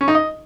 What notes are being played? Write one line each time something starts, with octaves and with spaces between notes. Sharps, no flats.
C#4
D#4
D#5